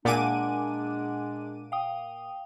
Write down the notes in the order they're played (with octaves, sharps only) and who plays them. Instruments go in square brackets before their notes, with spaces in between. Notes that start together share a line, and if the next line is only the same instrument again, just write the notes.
[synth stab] A#2 D6 D#7 [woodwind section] G#3 D4 [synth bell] F#5 G#5
[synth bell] F5 G5 D#6